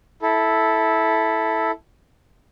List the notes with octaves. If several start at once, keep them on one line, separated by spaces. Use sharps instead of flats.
E4 A4